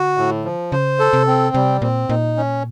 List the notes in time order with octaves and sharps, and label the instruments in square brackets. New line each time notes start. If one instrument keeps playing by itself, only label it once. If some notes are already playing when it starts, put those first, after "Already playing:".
Already playing: [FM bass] D3 [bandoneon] F#4
[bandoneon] A2
F3
[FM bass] C#3 [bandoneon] C5
[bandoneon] A4
[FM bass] C3
[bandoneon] C4
[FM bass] C3 [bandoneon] G3
[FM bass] A#2 [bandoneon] C4
[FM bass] A#2 [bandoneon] D#4
[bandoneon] C#4